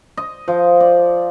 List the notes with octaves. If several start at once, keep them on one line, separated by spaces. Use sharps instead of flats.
D#5
F3
D5